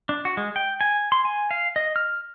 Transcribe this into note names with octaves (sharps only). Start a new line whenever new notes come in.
D4
F#4
G#3
G5
G#5
C6
G#5
F5
D#5
F6